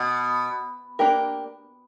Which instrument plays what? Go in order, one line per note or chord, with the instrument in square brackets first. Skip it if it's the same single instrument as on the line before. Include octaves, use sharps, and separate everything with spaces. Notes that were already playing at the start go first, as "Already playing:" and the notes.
Already playing: [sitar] B2
[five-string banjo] A#3 D4 G4 A#4